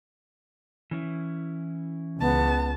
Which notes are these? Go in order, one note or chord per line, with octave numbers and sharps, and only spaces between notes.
E3 C#4 E4
C#2 B3 A5